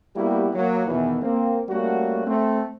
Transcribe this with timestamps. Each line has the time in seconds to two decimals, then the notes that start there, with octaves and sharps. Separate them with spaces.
0.14 G3 A#3 B3 E4 F#4 G4
0.53 F#3 A#3
0.87 E2 B2 D#3 E3
1.22 A#3 C4
1.68 G3 A3 A#3 C#4 F#4
2.26 A3 C4